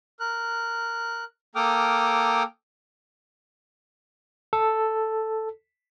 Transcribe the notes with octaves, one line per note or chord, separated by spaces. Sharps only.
A#4 F#6
A#3 A4 G5 D6 D#6 F6
A4